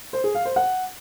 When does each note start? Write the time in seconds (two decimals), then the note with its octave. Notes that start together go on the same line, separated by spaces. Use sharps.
0.13 C5
0.24 G#4
0.35 F5
0.45 C5
0.56 F#5